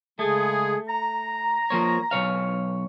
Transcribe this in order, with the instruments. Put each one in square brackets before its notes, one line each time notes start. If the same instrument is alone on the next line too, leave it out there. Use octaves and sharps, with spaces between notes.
[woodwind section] C#3 G#3 G#4 [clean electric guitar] A3
[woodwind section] A#5
[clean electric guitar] F3 A#3 C#5
B1 C#5 F5